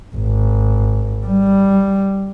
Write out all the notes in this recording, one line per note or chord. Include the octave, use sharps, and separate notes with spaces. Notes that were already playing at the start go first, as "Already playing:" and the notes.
G#1
G3